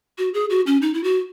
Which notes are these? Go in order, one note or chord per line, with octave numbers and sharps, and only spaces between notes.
F#4
G#4
F#4
C#4
D#4
E4
F#4